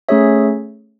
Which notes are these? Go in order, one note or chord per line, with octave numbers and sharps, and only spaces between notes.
A3 C#4 G#4 C#5 E5